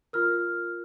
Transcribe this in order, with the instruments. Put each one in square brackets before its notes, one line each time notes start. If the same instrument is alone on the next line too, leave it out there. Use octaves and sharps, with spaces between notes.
[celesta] F4 A#4 F6